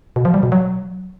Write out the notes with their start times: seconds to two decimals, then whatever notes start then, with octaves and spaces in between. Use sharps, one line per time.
0.16 B2
0.25 F3
0.34 G3
0.43 B2
0.52 F#3